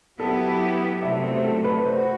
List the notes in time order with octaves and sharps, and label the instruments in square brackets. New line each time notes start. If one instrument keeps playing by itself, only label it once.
[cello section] F#3 B3 E4 G4 [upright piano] A4
[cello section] C3 F#3 A3 [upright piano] E5
[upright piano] C5
A4
B4
[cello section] F#4 [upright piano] C5